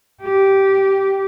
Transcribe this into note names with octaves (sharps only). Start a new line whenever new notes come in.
G4